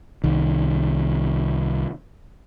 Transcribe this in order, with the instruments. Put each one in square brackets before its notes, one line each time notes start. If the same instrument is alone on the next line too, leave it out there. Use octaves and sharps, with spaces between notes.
[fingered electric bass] C2 D#3